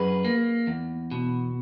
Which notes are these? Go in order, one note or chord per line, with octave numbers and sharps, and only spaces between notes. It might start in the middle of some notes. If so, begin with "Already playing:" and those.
Already playing: F#2 G#4 B4
A#3
E2
B2